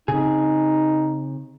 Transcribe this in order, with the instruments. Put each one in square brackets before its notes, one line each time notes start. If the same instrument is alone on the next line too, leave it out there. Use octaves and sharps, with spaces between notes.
[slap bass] C#3 C4 [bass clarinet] D#4 [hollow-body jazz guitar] G#4